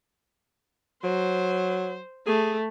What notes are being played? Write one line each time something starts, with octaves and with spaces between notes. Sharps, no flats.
F#3 C5
A3 G#4